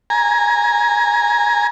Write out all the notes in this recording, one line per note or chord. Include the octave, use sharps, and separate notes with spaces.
G#5 A#5